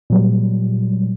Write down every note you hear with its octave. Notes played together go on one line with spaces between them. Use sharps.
A#2 F#3 G3